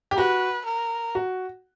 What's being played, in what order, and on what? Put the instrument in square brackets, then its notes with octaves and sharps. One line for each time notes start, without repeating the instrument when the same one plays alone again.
[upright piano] G4
[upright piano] F#4 [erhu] B4
[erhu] A#4
[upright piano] F#4